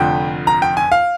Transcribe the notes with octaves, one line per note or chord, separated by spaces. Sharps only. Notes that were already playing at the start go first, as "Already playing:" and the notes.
Already playing: F1 F2 D3 G5
A#5
G5
G#5
F5